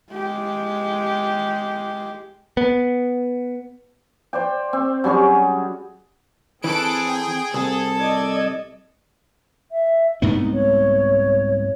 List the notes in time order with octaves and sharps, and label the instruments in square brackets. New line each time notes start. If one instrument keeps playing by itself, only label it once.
[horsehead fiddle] G#3 G4
[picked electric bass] B3
[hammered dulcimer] C5 D5 G5
C4
F#3 G3 C#4 G#4
[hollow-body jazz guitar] E3 [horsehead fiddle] C4 [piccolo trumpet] G#4 [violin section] A4 F#6 D7
[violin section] G5
[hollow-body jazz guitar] C2 [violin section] A4
[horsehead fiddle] D5 D#5 [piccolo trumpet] G#6
[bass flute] E5
[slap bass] C2 G#2 B3 [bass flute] D#4
[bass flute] C#5